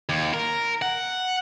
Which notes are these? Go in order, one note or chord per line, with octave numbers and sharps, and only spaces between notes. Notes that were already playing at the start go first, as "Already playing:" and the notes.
D#2
A#4
F#5